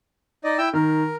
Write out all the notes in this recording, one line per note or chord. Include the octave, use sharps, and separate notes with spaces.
D#4 D5 D#5
E4 G5 E6
D#3 A#4